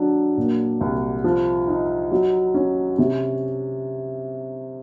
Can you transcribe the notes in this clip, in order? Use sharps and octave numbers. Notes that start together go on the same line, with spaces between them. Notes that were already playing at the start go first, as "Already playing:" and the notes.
Already playing: F#3 D4
A#2
C2
F3
D#4
F#3
C#4
C3